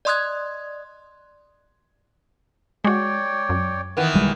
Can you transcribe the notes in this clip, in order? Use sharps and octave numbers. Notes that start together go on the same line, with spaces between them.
D5 D#5 C6 D#6 F#6 G#6
G#3 F#4 C#5 D5 G5
F#2
D#3 E3 B3
B1 G3 G#3